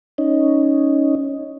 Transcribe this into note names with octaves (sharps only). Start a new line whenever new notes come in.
C#4 D#4